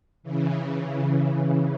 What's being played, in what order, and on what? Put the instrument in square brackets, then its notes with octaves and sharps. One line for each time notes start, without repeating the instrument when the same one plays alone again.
[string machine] C#3 E3